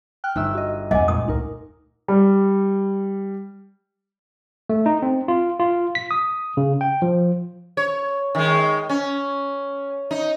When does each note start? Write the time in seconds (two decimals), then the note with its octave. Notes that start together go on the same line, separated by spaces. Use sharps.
0.24 G5 F6 F#6
0.36 G1 D#4 F4 E5 E6
0.55 F#4 D#5
0.91 F2 G#3 D#5 F#5 G#5 D6
1.08 A#2 D#6
1.28 D2 D#4 A#4
2.08 G3
4.69 A3
4.86 D#4
5.02 C4
5.28 F4
5.60 F4
5.95 B6
6.11 D#6
6.57 C#3
6.81 G5
7.02 F3
7.77 C#5
8.35 D#3 G#3
8.90 C#4
10.11 D#4